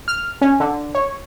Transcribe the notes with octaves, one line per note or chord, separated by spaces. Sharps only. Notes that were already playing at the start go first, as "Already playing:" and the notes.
F6
C#4
D3
C#5